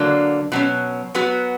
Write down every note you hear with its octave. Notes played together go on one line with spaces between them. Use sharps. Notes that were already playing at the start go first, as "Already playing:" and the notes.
Already playing: D3 F#3 A#3 D4
B2 F#3 C#4
F#3 B3 F#4